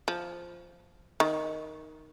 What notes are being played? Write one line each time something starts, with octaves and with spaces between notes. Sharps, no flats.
F3
D#3